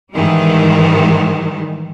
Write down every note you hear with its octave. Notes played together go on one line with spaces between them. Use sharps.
G#2 D#3 E3 G3